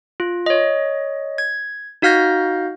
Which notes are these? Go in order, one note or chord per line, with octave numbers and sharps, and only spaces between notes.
F4
C#5 D#5
G#6
D#4 F#4 F5 F6 G6 A#6